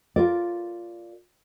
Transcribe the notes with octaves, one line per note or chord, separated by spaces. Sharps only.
F4 A#4 D5